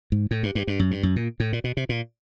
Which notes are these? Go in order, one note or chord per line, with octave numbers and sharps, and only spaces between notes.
G#2
A2
G2
G2
G2
F#2
G2
F#2
A#2
A2
A#2
B2
C3
A#2